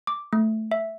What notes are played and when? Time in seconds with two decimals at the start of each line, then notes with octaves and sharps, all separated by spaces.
0.07 D6
0.33 A3
0.71 E5